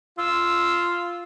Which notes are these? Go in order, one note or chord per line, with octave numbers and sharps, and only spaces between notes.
F4 E6